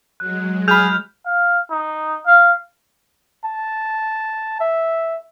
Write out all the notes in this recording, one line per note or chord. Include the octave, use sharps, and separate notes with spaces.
F#3 G#3 F#6
G#4 B5 F6 G6 F7
F5
D#4
F5
A5
E5